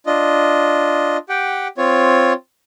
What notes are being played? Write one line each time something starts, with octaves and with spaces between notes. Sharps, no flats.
D4 F4 D#5
G4 F#5 G5
C4 F4 C#5